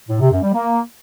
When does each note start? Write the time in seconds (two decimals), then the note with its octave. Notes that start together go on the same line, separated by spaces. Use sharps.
0.09 A2
0.20 C3
0.31 F#2
0.42 G3
0.54 A#3